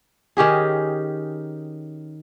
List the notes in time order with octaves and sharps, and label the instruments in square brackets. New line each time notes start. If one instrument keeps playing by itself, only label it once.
[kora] D#3 C#4 G4 G#4